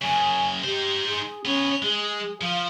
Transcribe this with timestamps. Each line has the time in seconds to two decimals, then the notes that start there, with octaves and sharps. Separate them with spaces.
0.02 F#2 C#3 G#5
0.64 D#4 G4 C5
1.08 G#4
1.45 B3 C#4 C#5
1.82 G#3 G#4
2.41 F3 F5